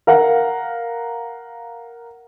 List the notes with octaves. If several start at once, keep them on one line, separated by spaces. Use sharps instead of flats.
A#4 F5 F#5